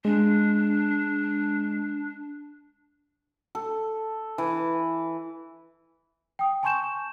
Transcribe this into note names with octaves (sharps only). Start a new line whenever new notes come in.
G#3 D4
A4
E3
G5 D#6
G#5 A5 C6 C#6 G6 E7